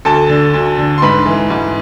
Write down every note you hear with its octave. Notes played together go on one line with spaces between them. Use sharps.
D2 A4 A5
D3
D2
D3
C6
G#2 B4 B5
E3
G#2